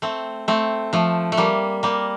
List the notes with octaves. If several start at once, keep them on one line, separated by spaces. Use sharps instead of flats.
A3 C4
A3 C4
F3 A3
A3
G3 A#3
G3 A#3